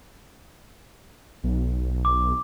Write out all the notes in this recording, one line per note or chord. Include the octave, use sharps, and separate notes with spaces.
B1
D6